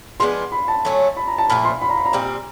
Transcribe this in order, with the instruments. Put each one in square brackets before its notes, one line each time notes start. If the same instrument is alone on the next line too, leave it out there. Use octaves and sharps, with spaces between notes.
[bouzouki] F3 G#3 B3 D4 [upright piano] C6
[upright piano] B5
A5
[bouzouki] D3 F#3 A3 C#4
[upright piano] B5
A#5
A5
[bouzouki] A#2 F3 A3 [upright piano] B5
[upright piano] C6
B5
A#5
B5
A#5
[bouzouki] A#2 G3 C4